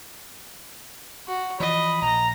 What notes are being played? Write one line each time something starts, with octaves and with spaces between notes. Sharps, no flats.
F#4
E3 F3 D#5 B5
A#1 A#5